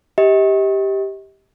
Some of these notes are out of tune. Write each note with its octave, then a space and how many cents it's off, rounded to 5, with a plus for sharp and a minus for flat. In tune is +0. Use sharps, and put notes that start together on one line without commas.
G4 +0 D#5 +40